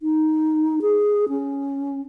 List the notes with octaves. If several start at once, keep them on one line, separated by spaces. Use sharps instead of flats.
D#4
G#4
C#4